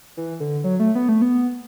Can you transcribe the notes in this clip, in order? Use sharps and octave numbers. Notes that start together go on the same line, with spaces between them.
E3
D3
F#3
A3
B3
A3
B3